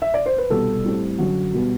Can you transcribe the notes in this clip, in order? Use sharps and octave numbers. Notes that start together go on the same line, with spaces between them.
E5
D5
C5
B4
C2 B2 G3 A4
A2 G3 C4
F#2 D3 F#3 F#4
B2 G3 B3